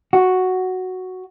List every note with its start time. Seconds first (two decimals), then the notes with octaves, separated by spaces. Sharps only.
0.13 F#4